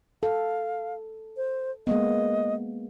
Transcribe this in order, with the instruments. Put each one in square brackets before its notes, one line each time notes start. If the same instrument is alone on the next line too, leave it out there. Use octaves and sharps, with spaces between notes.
[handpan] A4 [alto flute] F5
[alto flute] C5
[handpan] G#3 A#3 B3 [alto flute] D#5